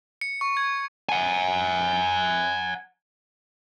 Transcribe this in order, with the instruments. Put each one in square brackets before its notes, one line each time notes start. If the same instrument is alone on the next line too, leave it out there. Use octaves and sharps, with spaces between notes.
[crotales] C#7
C#6
G#6
[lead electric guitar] F#5 G#5